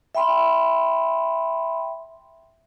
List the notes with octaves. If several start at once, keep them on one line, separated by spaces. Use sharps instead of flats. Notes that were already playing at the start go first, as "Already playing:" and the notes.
E5 G5 B5 C6